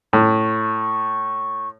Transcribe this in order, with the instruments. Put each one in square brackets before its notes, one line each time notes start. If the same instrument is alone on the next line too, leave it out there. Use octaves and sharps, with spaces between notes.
[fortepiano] A2 [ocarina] C#6